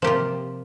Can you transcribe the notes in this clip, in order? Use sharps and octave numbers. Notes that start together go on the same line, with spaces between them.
C3 F3 A#3 F4 G4